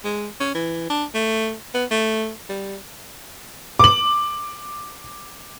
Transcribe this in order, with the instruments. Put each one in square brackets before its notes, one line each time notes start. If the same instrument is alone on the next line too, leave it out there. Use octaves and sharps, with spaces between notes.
[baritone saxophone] G#3
C#4
E3
D4
A3
B3
A3
G3
[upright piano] D6 F#7